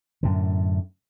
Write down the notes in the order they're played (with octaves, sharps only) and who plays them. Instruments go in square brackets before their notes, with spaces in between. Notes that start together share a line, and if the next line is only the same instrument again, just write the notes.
[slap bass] F#2 A2 D3